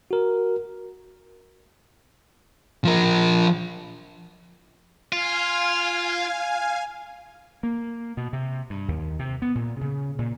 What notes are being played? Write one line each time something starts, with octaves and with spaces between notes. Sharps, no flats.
F#4 A#4
F3 A#4
F4 F5 G#5
A#3
B2
C3
G2
D#2
C3
B3
A#2
C#3
A#2